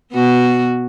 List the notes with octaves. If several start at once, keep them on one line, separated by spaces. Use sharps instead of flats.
B2 B3 F#4